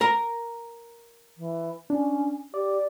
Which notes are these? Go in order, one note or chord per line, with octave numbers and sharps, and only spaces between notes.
A#4 A#5
E3
C#4 D4
G4 D5